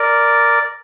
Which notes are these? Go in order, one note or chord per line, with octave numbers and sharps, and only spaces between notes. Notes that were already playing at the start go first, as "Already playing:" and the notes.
Already playing: A#4 D5